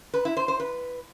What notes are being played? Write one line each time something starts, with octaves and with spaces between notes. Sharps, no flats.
B4
E4
C5
C5
B4